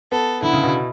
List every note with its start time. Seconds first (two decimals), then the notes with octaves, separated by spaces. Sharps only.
0.12 B3 A4
0.42 D3 E4
0.53 C#3
0.63 B2